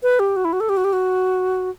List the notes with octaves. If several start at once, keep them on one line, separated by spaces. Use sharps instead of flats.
B4
G4
F#4
E4
F#4
A4
G4
F#4
G4
F#4